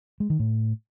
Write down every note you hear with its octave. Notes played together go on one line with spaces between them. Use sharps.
G#3
D#3
A2